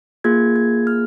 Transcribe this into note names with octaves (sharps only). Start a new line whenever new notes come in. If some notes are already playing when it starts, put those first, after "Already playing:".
A#3 F4 G#4 G#6
G#6
F6